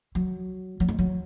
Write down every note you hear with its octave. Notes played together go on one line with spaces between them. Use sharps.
F#3
F#3
G#3
F#3